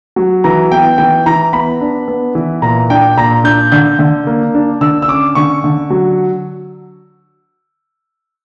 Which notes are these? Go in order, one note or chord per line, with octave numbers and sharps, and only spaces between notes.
F#3
E3 A#5
B3 G5
E3 G5
E3 A#5
B3 B5
D4
B3
E3
A#2 A#5
D4 G5
A#2 A#5
D4 G6
D3 G6
D3
A#3
D4
D3 E6
E6
C#4 D6
D3 C#6
D3
F#3